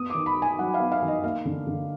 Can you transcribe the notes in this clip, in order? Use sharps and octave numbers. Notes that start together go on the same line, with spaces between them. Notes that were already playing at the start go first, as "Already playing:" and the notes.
Already playing: B3 D#6
D#3 D6
B5
D#4
G#5
F#3 F#5
F5
B3
F5
D#3
D#5
A#3 F5
D3
D3